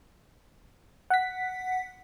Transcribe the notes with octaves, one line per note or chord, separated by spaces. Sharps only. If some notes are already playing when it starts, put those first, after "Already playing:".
F#5 B6